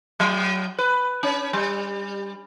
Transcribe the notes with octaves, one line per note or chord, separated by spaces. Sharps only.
F#3
B4
C#4
G3